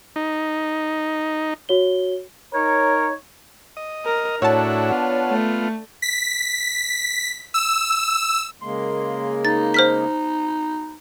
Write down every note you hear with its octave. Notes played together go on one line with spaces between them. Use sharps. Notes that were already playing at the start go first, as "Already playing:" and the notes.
D#4
F#4 C#5 G7
D#4 A#4 C#5
D#5
A#4
A2 D4 E4 F#4 C#5 F#5 A5
B3 F4
A3
B6
E6
C#3 G#3 A#3 C6
D#4 A6
C5 F6 B6